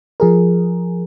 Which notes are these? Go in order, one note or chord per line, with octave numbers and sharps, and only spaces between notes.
F3 G#4 A#4